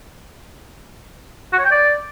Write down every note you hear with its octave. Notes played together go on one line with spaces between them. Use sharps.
F#4
C#5
G5
D5